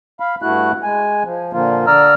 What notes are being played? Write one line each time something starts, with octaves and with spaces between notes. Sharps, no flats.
F5 B5
G2 A3 E4 F#4 F#6
G#3 G#5
F3
A#2 D3 F3 A#3 F4
D3 D5 A#5 E6 F6